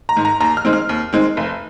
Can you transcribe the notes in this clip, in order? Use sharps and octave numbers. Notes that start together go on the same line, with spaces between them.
A#5
G#2 D#3
A#5
D#2 A#5
F6
D#3 G#3 C4
F6
D#2
D#3 G#3 C4
F1